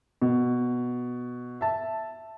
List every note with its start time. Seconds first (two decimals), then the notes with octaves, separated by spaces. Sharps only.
0.22 B2
1.61 E5 A5